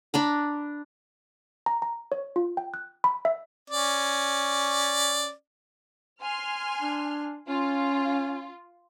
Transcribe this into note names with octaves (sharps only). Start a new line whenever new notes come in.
D4 A#5 B5
A#5
A#5
C#5
F4
G5
F#6
B5
E5
C#4 D5
G#5 C6 F6
D4
C#4 F4